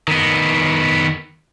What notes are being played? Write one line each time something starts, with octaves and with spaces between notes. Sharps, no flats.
D#3 B3